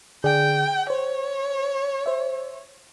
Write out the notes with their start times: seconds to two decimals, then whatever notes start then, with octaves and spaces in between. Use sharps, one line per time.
0.24 D3 G#4 D5 G5
0.90 C5 C#5
2.06 C5 E5